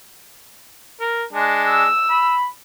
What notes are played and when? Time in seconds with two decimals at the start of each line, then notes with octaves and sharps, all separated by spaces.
1.01 A#4
1.33 G#3 D4
1.69 E6
2.10 B5